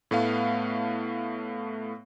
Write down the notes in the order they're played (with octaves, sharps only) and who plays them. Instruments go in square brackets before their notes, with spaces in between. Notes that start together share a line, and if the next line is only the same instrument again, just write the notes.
[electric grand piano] A2 A3 B3 F5